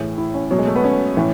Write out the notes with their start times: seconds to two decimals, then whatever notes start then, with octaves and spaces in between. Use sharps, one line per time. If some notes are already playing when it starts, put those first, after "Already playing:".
Already playing: A2 E3 G#4
0.18 E4
0.34 C#4
0.51 B2 F#3
0.59 G#3
0.67 A3
0.76 B3
0.84 C#4
1.17 A2 E3